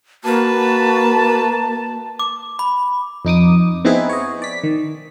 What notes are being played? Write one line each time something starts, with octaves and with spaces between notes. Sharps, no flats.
A#3 F#4 B4 A5
D6
B5
F2 D#4 D6 D#6
B3 C4 D#4 E4 G#4 B4
C#5 D#5
D5 B6
D#3